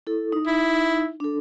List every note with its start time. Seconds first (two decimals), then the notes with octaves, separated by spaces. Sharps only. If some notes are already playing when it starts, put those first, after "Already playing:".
0.07 E4 A4
0.32 D#4
0.47 E4
1.20 D4 A4